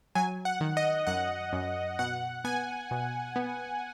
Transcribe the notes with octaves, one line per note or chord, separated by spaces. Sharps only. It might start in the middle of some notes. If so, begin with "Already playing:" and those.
F#3 G#5
F#5
D#3
D#5
F#2 F#5
F#2
B2 F#5
B3 G#5
B2
B3